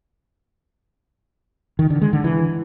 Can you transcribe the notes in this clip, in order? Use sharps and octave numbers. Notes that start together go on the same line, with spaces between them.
D#3
D3
G#3
D3
E3